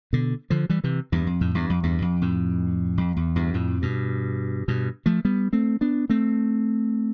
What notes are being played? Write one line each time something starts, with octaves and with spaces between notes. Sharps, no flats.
B2 D3
D3 F3
E3 G3
C3 E3
E2 G2
F2
F2 A2
E2 G2
F2
E2 G2
F2
F2 A2
F2
E2
E2 G2
F2 A2
G2 B2
G2 B2
F3 A3
G3 B3
A3 C4
B3 D4
A3 C4